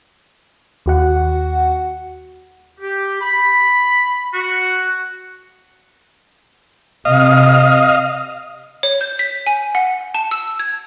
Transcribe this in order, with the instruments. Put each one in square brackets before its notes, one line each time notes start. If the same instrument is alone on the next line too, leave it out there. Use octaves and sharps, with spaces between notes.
[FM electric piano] D#2 F#4 F#5
[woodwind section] G4
B5
F#4
[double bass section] C3 [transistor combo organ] D#5 F5
[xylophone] C#5
G6
B6
G#5
F#5
A5
E6
G#6